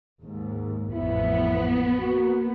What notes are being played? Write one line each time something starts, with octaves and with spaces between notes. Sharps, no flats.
D#2 G#2
A1 F2 B3 E4
A#3 F#4